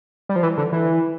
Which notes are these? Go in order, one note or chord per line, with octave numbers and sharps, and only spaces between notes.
G3
F3
E3
D3
E3